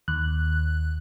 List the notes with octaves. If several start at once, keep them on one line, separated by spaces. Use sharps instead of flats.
D#2 F#6